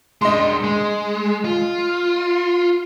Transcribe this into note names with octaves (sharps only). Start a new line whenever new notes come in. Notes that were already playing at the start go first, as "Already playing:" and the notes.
G#3 D4 D#5 C6
G#3
F4